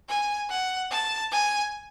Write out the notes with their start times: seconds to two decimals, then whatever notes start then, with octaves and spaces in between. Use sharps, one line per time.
0.09 G#5
0.50 F#5
0.91 A5
1.31 G#5